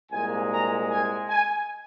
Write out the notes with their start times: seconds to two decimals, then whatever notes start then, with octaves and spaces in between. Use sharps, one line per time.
0.11 C2 A#2 G#3 G#5
0.51 A#5
0.90 G#5
1.30 G#5